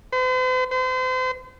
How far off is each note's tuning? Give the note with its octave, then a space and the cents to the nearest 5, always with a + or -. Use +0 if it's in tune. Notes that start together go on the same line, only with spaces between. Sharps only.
C5 -45
C5 -35